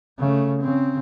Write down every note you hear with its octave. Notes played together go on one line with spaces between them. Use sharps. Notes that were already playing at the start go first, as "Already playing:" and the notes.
C#3 A3
C#3 C4